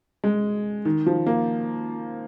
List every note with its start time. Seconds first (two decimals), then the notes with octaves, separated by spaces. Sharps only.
0.24 G#3
0.85 D#3
1.06 F3
1.26 A#3